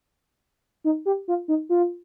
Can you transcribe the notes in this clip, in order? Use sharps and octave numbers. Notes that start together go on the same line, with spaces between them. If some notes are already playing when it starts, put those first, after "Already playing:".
D#4
G4
F4
D#4
F4